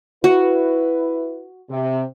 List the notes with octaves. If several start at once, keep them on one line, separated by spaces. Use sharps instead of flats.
E4 F#4 B4
C3